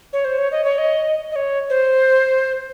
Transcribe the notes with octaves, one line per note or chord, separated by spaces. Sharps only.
C#5
C5
C#5
D#5
C#5
D#5
D#5
C#5
C5